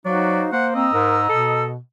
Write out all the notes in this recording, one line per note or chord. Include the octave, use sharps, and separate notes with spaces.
F#3 D#4 F#4 C5 D5 F5
A#3 C5 F#5
C4 D#5 A#5 D#6 E6
G#2 A#4
B2 A4